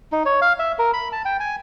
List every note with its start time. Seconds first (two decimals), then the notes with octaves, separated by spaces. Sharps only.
0.12 D#4
0.26 C#5
0.42 F5
0.59 E5
0.79 A#4
0.93 B5
1.12 A5
1.25 G5
1.40 G#5